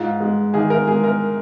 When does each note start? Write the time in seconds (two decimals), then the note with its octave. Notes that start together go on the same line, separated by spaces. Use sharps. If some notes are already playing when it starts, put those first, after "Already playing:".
Already playing: G#2 F4
0.20 G#3
0.54 D#3 G#4
0.70 A#4
0.87 G#3 G#4
1.04 A#4